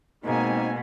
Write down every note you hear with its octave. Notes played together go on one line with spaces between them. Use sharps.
B2 G#3 A#3 C4 D#4 G#5